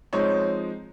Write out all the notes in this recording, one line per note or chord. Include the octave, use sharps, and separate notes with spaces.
F3 G#3 C4 D#4 C#5